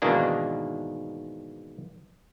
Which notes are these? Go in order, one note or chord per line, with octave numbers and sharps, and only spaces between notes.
G#2 B2 D#3 E3 A#3 D4